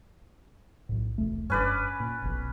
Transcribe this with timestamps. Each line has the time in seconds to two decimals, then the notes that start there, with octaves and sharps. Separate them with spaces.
0.89 B1 A2
1.18 E1 C2 A3
1.50 F#1 G2 C#4 B4 D5
2.00 A#2
2.22 F1 B1